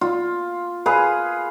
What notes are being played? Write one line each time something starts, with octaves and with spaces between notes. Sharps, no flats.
F4
G#4 B4 F5